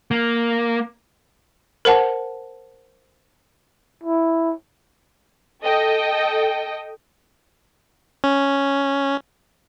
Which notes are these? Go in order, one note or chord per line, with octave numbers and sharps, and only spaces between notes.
A#3
A#4 C5 F#5 A5
E4
A4 D#5 G5
C#4